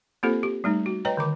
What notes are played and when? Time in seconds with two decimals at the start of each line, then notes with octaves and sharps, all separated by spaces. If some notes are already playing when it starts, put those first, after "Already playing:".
0.23 A#3 C4 F4 G4 A4 C5
0.43 G4
0.64 G3 A3 D#4
0.86 F#4
1.05 B4 C#5 D#5 G5 A#5
1.17 D3 D#3 D6